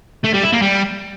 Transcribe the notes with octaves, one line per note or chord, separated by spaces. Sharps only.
A3
G3
E4
A#3
G3